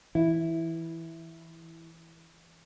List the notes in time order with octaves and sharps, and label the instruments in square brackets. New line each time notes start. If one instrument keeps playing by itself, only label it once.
[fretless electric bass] E3 [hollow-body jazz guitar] E4